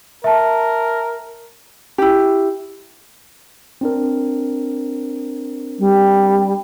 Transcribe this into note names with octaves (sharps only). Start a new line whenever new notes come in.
A#4 E5 A5
E4 G4
C4 D4 A#4
G3